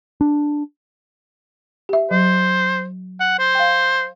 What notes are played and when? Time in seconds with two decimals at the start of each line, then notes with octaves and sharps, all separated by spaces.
0.21 D4
1.89 G4 E5
2.11 F#3 C5
3.20 F#5
3.39 C5
3.55 F5 G5